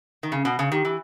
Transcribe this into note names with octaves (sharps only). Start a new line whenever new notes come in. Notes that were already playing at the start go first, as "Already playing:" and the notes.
D#3
C#3 C#4
B2
C#3
D#3 G4
E3